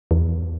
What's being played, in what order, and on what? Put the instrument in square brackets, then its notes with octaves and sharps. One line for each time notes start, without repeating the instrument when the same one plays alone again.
[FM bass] E2